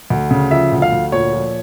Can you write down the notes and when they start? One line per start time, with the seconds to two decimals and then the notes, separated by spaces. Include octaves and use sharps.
0.10 D2
0.31 C#3
0.51 F3 E5
0.72 D2
0.82 F5
0.92 D2
1.12 A#2 C#5
1.33 F3